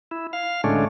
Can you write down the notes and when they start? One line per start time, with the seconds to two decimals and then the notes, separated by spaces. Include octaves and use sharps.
0.11 E4
0.33 F5
0.64 A2 D3 G#3 A3 C#4 D4